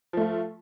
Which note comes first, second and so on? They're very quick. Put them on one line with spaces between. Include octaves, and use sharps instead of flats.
F3 A3 F4